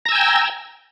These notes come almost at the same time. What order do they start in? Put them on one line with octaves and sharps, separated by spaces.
A#5 E6 G#5 G5